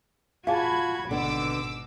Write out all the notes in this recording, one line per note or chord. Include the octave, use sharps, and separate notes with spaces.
F4 F#4 G#4 F5 G#5 A5 B5 G#6
G#1 B2 D3 B3 D6 E6